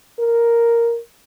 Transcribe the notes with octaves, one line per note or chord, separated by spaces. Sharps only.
A#4